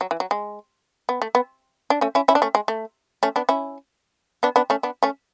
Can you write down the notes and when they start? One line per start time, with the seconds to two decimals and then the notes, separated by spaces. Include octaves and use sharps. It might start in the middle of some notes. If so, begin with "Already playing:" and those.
0.01 F#3
0.11 E3
0.20 F#3
0.31 G#3
1.09 B3
1.22 A3
1.35 B3
1.90 D4
2.01 A3 C#4
2.15 C#4 E4
2.28 C#4 E4
2.35 D4
2.42 A3 C#4
2.55 G#3
2.68 A3
3.23 A3 C#4
3.36 B3 D4
3.49 C#4 E4
4.43 B3 D4
4.56 B3 D4
4.70 A3 C#4
4.83 B3 D4
5.03 A3 C#4